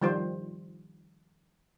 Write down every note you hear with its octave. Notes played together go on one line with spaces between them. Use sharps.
D#3 F3 G3 F4 C5